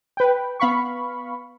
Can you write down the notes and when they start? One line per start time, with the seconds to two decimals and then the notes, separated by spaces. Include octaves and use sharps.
0.17 B4 G5
0.60 B3 F5 B5 C#6